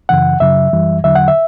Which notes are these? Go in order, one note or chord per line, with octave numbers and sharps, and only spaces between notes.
F#2 C#3 E3 F#5
F#2 C#3 F#3 E5
F#2 E3 G3
E2 D3 F#3 E5
F#5
E5